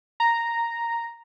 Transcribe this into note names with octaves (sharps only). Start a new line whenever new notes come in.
A#5